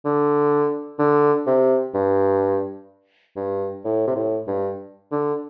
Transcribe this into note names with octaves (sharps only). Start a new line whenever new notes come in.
D3
D3
C3
G2
G2
A2
C3
A2
G2
D3